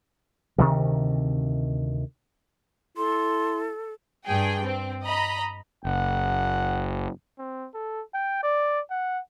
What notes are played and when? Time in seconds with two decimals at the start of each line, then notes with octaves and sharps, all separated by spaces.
0.58 D2 C3 D#3 E3
2.97 E4 A4 C6
4.24 G2 G#4 G5
4.63 C4
5.04 D#5 A#5 B5
5.85 F#1 F#5
7.38 C4
7.74 A4
8.14 G5
8.43 D5
8.90 F#5